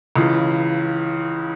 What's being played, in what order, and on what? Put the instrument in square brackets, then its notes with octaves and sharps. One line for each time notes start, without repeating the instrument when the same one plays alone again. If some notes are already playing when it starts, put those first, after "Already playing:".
[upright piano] C#2 C#3 E3